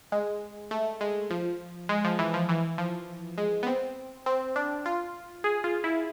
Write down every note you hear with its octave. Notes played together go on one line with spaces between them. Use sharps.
G#3
A3
G#3
F3
G#3
F3
E3
F3
E3
F3
G#3
B3
C4
C4
D4
F4
G#4
F4
E4